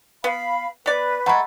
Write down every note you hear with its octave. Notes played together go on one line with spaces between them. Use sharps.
B3 F5 B5
B3 B4 D5
G#3 A3 F#5 A#5 B5